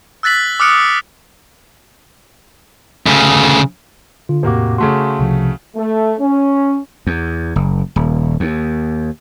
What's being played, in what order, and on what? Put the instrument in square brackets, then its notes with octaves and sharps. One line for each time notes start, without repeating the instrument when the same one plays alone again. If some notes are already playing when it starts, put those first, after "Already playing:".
[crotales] E6 F#6 A6 B6 F#7
D6 D#6 F6 F#6 C#7 D7
[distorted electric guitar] D2 C#3
[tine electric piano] D3 F4
[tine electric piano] E2 A2 D6 [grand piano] C3 A#3 F#4
[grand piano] C#3 A3 F#4 [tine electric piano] C6
[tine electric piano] C2 C3 F3
[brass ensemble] A3
C#4
[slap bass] E2
F#1
D#1
D#2